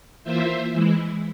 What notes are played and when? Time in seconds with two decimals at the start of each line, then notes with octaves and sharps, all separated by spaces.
0.24 E3 A#3 F4 C5 E5
0.73 E3 G#3 E4